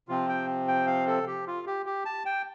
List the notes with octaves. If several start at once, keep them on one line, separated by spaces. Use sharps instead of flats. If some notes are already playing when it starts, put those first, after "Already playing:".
C3 F3 C4 F4
G5
G5
F5
A4
G4
F4
G4
G4
A5
G5